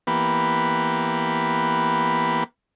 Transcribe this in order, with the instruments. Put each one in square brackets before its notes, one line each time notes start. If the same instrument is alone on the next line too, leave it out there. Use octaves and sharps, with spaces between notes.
[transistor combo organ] E3 A#3 B3 G4 B4